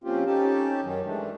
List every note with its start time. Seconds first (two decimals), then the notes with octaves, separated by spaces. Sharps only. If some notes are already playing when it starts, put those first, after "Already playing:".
0.04 F3 A#3 C4 C#4 F4 G4
0.26 C#4 D#4 G4 A4 A5
0.84 F#2 D#3 F#3 C#4
1.05 E3 G#3 A3 D4